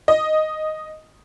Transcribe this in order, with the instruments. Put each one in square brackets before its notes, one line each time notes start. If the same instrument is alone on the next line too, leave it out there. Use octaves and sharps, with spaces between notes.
[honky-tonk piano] D#5